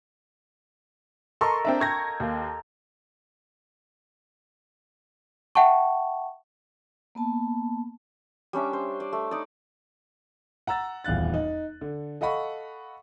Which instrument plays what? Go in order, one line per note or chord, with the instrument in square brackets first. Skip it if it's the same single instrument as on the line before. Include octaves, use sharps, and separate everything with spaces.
[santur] A4 A#4 D#5 [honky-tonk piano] C6 C#6
[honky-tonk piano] C4 D4 E5
[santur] F5 G5 [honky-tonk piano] C#6 G#6 A#6
[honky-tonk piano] D#2 A#3
[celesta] E5 F#5 G5 A5 C#6
[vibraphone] A#3 B3 A5
[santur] G3 C#4 D4 E5
C5
D5
A3
D#4 D5
[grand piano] F#5 A#5 E6 A6
D#1 E2 F5 F#6 A6
D#4
D3
A4 D#5 F5 F#5 B5 C#6